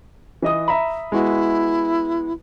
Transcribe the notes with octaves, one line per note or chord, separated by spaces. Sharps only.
E3 D#5 D#6
E5 A#5 B5
G#3 B3 E4 F#4